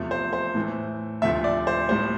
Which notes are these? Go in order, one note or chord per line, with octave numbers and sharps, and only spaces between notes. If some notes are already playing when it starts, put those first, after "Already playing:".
Already playing: E2 C3 F3 A3
C5
C5
A2 E3 A3
D2 C3 F3 A3 E5
D5
C5
A2 G3 C5